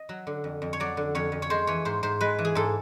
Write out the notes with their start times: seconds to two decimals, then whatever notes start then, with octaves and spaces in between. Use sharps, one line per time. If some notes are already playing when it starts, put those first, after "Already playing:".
Already playing: D#5
0.09 F#3
0.27 D3
0.44 F2
0.62 F2
0.73 C#5
0.80 F#3 D5
0.97 D3
1.15 F2 C#5
1.32 F2
1.42 C#5
1.50 G#3 C5
1.67 E3 C#5
1.85 G#2 C5
2.03 G#2 C5
2.21 G#3 B4
2.39 E3
2.45 G#4
2.55 G#2 A4